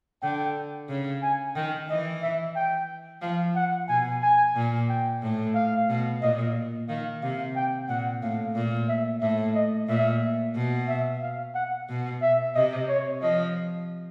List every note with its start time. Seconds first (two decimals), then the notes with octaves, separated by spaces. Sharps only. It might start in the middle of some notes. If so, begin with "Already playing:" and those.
0.23 D3 G5
0.89 C#3
1.23 G#5
1.56 D#3 G5
1.89 E3 D#5
2.22 E5
2.56 G5
3.22 F3 F5
3.56 F#5
3.89 B2 G#5
4.23 G#5
4.56 A#2
4.89 G5
5.22 A2
5.55 F5
5.89 B2
6.22 A#2 D#5
6.89 D#3 F5
7.22 C3 F5
7.56 G5
7.89 A#2 F#5
8.22 A2 F5
8.55 A#2
8.88 E5
9.22 A2 E5
9.55 D#5
9.88 A#2 E5
10.55 B2
10.88 E5
11.22 F5
11.55 F#5
11.89 B2
12.22 E5
12.55 C3 D#5
12.89 C#5
13.22 F3 D#5